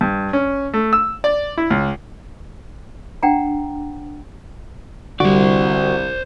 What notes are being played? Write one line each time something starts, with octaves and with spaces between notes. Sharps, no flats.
G2
C#4
A3
E6
D5
E4
C#2
D4 F#5 G5 A#5
C2 D3 G3 F#4 C5 D5